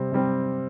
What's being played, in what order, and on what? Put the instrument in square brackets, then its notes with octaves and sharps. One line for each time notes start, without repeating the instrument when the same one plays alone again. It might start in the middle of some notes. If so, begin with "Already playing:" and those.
Already playing: [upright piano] C3 G3 C4
C3 G3 C4